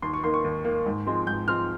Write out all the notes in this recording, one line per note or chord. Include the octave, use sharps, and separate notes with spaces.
D#2 C6
C#6
D#3 A#3 C6
C#6
D#2
D#3 A#3
G#2
F3 G#3 C4
G#2 G6
F3 G#3 C4 F6